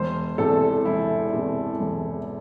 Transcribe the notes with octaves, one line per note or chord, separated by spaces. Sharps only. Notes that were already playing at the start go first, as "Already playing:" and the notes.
Already playing: E1 C5
E2 C3 A4
E1 E4
E2 C3
E1